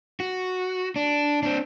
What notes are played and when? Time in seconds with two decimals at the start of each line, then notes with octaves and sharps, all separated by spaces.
0.20 F#4
0.96 D4
1.43 C4 D4